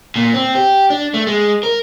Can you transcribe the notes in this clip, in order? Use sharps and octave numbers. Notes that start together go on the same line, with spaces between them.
A#2
C4
G4
D4
A3
G#3
A#4